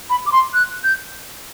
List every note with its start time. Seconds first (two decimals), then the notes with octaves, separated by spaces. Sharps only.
0.10 B5
0.26 D6
0.32 C6
0.54 F#6
0.84 G6